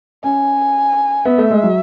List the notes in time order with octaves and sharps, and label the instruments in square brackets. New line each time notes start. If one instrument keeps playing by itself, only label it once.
[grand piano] C#4 [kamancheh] G#5
[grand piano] B3 [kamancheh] E5
[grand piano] A3
G#3
F#3